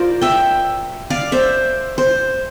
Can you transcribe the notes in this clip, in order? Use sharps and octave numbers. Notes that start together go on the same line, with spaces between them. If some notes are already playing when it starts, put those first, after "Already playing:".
Already playing: F4 A#4 C5 D5
E5 G5
D5 F5
C5 E5
C5